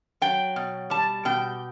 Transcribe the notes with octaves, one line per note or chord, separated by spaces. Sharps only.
F#3 G5
B2
G3 A5
B2 G5